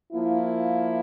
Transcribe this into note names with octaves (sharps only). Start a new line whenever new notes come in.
F3 A#3 E4